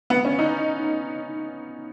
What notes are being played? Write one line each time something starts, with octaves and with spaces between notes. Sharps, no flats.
B3
C#4
D#4